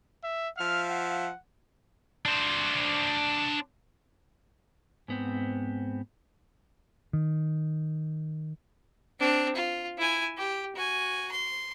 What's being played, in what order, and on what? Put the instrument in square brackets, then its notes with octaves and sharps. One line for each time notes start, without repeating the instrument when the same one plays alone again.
[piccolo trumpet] E5
[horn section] F3 E5 F5 [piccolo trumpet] F6
[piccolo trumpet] F#5
[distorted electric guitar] D4 C5
[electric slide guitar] G#2 B3 C4
[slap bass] D#3
[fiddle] C4 D4
F4
E4 G#5
G4
F#4 G#5
C6